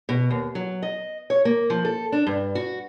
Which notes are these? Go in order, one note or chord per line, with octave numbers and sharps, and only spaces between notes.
B2
D#2
F#3
D#5
C#5
A#3
F3
A4
D4
G2
F#4